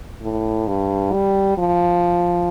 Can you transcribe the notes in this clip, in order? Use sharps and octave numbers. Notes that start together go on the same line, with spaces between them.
A2
G2
G3
F3